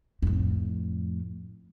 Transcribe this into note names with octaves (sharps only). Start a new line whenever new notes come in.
F2 A2